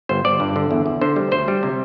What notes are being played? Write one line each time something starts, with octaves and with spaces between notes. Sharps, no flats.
G1 C5
G1 D5
G2
D3
E2
E2
D3 C5
G3
D2 C5
G3
C3